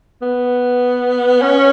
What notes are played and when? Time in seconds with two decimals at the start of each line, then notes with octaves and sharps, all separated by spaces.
0.22 B3
1.42 C#4